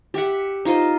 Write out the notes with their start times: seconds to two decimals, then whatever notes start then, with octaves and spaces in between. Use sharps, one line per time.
0.14 G4 E5 F#5
0.65 D#4 F4 C5 D#5